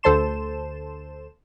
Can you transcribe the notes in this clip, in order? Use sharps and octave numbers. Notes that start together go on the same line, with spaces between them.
D2 A4 C5 A5 C6 E7